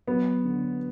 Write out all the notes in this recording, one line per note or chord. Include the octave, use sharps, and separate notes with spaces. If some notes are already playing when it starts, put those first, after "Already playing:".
F#3 B3
D3